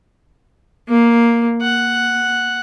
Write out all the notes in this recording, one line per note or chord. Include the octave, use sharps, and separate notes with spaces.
A#3
F#5